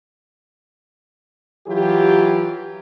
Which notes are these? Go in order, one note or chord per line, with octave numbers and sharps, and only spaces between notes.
E3 F#3 F4 G4